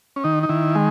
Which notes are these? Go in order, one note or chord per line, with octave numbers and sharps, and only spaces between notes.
C#4
D#3 D#4
D#4
D#3 E4
G#3